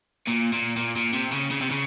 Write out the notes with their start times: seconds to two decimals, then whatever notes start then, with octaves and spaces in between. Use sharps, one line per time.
0.28 A#2
0.53 A#2
0.77 A#2
0.96 A#2
1.14 C3
1.32 C#3
1.51 C#3
1.62 C3
1.71 C#3